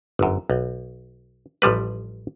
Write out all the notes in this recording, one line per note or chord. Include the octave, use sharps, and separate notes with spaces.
G1 F#2
B1
A1 F3 G3 B4